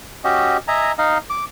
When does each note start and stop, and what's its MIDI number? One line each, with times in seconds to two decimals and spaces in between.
0.24 0.57 61
0.24 0.57 66
0.24 0.57 67
0.24 0.57 75
0.68 0.92 75
0.68 0.92 76
0.68 0.92 80
0.68 0.92 82
0.98 1.18 63
0.98 1.18 75
0.98 1.18 77
1.30 1.44 86